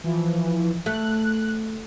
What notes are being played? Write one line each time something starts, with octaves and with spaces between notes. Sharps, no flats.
E3 F3
A3 F#6